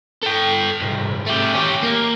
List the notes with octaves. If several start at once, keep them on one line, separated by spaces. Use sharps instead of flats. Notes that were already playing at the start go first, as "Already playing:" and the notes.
A4 G5
C2 G#2
A3 G4
C#4 G4
A#3